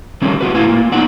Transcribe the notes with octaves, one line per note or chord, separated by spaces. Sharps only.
D#3 G3 A3 C4 C#4
F4 F#4 B4
A2 A3 E4 B4 F5 G#5
A#3 F4
B3 D4 D#4 F#5 G5